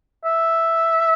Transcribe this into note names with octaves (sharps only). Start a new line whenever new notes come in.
E5